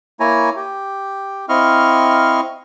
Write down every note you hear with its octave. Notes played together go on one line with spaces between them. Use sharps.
A#3 E4 C#5 G#5 A#5
G4
C4 E4 D#5 F5 C#6 F6